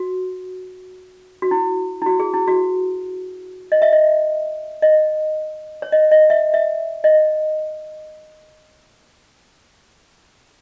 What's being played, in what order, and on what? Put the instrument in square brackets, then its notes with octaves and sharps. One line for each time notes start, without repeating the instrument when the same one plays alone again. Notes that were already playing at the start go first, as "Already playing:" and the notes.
Already playing: [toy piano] F#4
F#4
E4
E4
F#4
G#4
E4
F#4
D#5
E5
D#5
D#5
C#5
D#5
D#5
E5
E5
D#5